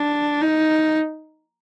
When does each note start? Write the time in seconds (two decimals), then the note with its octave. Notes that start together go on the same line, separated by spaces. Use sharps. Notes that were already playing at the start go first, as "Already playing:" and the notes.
Already playing: D4
0.41 D#4